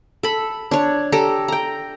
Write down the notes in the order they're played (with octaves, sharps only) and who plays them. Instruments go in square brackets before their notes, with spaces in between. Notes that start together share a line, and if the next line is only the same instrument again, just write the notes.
[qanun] A4 B5
D4 C#5
G4 A4 A#5
G5 A#5